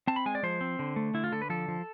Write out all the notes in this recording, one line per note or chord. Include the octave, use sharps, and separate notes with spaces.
C4 A5
B5
G#3 G#5
D5
F3 C5
C4
D3
A3
D3 E4
F4
D3 A4
B4
F3 A4
F3